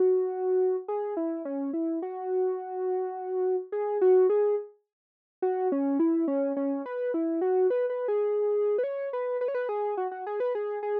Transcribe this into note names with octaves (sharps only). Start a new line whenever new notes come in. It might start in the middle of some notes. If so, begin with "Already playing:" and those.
Already playing: F#4
G#4
E4
C#4
E4
F#4
G#4
F#4
G#4
F#4
C#4
E4
C#4
C#4
B4
E4
F#4
B4
B4
G#4
B4
C#5
B4
B4
C#5
B4
G#4
F#4
F#4
G#4
B4
G#4
G#4